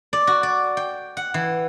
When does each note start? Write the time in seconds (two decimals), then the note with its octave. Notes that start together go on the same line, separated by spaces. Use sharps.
0.13 D5
0.27 F#4
0.43 D5
0.77 G5
1.17 F#5
1.34 E3